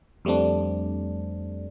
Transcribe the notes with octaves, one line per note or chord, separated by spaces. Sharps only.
F2 G3 A3 C4 D4